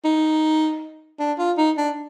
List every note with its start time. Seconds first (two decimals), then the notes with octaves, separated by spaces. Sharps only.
0.04 D#4
1.19 D4
1.38 F4
1.57 D#4
1.77 D4